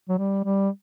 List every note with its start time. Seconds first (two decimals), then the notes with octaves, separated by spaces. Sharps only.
0.09 F#3
0.18 G3
0.44 G3